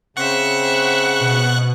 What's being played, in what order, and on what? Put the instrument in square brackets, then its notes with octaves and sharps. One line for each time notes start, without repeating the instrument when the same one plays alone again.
[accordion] C#3 [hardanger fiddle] C4 E5 [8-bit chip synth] F#5 C#6 F#6
[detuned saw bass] B2